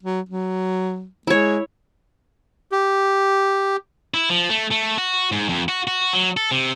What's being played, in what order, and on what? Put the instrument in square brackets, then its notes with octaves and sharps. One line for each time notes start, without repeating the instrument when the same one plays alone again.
[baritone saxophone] F#3
F#3
[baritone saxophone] G#3 [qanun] E4 C#5
[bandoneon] G4
[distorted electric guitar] E4
F3
A3
A3
F#4
G#2
F2
F#4
F#4
F#3
A4
C3